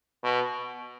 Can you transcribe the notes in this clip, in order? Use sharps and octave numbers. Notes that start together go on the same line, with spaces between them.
B2